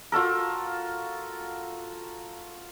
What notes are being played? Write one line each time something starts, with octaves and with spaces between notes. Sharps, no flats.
F4 F#4 A4 A#4